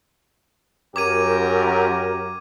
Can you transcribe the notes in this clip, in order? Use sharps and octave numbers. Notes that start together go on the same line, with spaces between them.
F#2 G4 A#4 D6 G#6 D#7